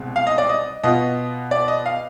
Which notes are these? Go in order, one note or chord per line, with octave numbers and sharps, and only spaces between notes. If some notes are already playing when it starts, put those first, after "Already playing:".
Already playing: C2 B2 G#3 C4
F5
D#5
D5
D#5
B2 B3 F4 D#5
D5
D#5
F5